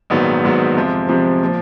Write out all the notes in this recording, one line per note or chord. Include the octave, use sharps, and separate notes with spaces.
A#1 G#2 D#3 F#3 B3
A#1 G#2 D#3 F#3 B3
F2 C3 F3 G#3
F2 C3 F3 G#3
A#2 F3